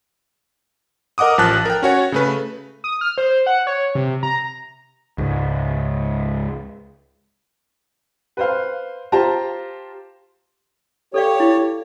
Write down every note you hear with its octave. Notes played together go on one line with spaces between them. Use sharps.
A#4 D#5 F#5 D6 D#6
A1 F3 A5 F#6 A6
A#4 G5
C#4 F#4 C#5
C#3 A3 B4
D#6
F6
C5
F#5
C#5
C3
A#5
C#2 G#2
B4 C5 F5
F4 G4 C5 A5 A#5
G4 A4 C#5 D5 F5
E4